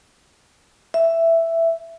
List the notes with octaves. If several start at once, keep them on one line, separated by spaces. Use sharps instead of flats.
E5